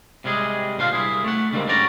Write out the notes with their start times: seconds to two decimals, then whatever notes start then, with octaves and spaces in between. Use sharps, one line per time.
0.24 C3 G3 G#3 G#4
0.78 A#2 D3 C5 F5
0.93 C2 E4 G#4
1.24 A3 F#5
1.52 D3 G3 G#3 A#3 C4
1.67 G#2 G3 C#4 F#4 D5 A#5